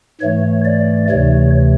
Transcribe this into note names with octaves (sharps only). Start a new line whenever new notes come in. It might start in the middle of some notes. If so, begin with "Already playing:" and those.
G#2 E3 A3 C#5
D5
D2 C3 E3 A3 C#5